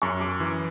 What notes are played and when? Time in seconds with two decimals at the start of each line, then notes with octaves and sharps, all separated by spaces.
0.02 F#2 C#6
0.21 D6
0.40 E3